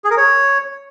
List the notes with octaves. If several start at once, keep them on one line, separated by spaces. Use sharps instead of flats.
G#4
A#4
C#5